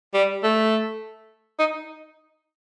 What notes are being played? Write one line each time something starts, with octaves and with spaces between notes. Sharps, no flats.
G3
A3
D#4